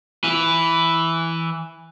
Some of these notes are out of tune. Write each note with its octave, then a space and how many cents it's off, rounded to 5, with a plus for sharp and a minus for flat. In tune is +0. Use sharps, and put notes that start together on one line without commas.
E3 +0 B4 +5